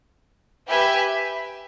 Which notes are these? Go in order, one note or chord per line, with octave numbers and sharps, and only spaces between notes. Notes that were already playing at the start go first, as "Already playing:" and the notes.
G4 B4 E5 G#5